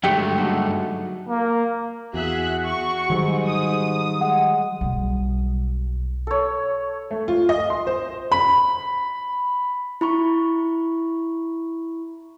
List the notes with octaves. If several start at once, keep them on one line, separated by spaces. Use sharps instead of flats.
G2 D3 F#3 G#3 A3 G4
D#4 F#4 A4
A#3
E2 F#4 G#4 E5 F#6
C#6
G#2 D#3 F#3 G3
D#6
G#3 F#5
B1 G3
A4 C#5
A3
F4
D#5
C6
C5
B5
E4 B5 C#6